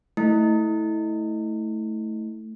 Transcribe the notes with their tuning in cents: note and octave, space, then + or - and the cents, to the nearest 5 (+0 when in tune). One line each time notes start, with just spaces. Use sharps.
A3 +0 E4 -25